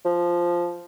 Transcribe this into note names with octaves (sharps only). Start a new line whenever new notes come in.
F3